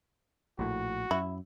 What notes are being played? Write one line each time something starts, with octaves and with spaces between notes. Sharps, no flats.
A#1 A2 F#4
F#2 E4